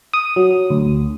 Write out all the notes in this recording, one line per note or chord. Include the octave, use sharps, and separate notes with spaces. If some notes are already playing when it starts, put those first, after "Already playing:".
D#6
F#3
D2